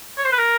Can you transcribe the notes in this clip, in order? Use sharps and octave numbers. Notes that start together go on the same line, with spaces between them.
C#5
C5
B4
A#4